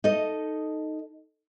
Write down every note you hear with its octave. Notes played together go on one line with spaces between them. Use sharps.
D#4 A4 D#5